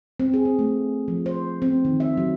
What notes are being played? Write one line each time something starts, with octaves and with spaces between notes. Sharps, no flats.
C4
G#4
C4
A3
F3
C5
C4
D#3
E5
F#3